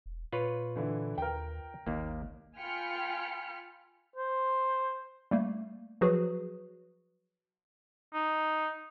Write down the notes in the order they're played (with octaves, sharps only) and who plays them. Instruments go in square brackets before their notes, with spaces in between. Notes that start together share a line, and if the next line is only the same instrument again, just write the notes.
[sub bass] E1
[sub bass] A#2 [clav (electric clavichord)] F4 B4 C#5
[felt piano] D3 E3 E4
[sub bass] D#2 [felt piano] A#4 G5
[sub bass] G#1 [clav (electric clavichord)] D#2 A#3
[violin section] F4 G5 G#5 B5 F6 C#7
[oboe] C5
[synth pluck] G3 A3 A#3
F3 F#3 F#4 G#4 B4
[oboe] D#4